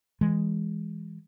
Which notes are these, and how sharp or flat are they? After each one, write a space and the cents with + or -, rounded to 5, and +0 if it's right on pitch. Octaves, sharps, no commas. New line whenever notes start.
E3 +0 G#3 -15